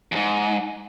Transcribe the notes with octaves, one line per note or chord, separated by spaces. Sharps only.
E2 G#2